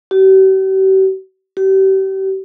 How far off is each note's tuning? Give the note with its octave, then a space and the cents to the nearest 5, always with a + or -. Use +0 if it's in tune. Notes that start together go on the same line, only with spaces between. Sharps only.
G4 -45
G4 -35